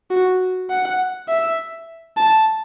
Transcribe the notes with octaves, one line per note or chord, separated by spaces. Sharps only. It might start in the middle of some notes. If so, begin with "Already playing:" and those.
F#4
F#5
E5
A5